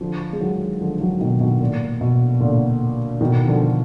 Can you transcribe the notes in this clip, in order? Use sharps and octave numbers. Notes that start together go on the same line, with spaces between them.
D3 F3
G#3
D#3 F#3
D3 F3
D#3 F#3
B2 D#3
B2
A#2
B2
A#2 D3
B2 D#3
D3 F3